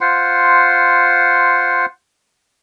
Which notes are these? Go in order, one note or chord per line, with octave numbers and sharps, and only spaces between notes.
F4 C5 F#5 C6